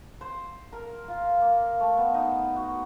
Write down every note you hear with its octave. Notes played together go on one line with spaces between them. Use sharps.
C5
A#4
F4
A#3
A3
B3
D#4
F#4